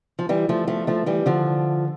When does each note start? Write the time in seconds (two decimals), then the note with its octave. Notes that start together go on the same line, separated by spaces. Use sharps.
0.19 F3
0.29 E3 G3
0.49 F3 A3
0.67 F3 A3
0.87 F3 A3
1.06 E3 G3
1.26 D3 F3